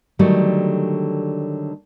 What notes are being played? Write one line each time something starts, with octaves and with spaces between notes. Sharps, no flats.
D3 D#3 F#3 G3 A3